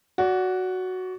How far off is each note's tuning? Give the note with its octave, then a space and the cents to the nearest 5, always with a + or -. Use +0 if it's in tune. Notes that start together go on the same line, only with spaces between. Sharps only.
F#4 +0 D5 -30